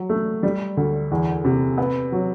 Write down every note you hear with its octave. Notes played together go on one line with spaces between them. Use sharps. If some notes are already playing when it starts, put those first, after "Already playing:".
Already playing: F#3
A3
G3
D2
E2
C3
B3
F#3